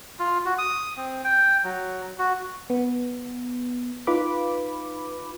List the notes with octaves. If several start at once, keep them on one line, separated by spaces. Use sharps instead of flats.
F4
F#4
D#6
C4
G5
F#3
F#4
B3
D#4 F4 B4 B5 D6